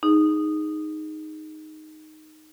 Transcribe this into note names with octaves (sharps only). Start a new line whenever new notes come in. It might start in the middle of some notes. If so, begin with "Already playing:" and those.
D#4 G#4